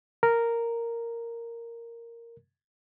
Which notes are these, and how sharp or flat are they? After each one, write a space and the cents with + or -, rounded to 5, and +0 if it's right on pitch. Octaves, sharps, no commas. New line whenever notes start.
A#4 -5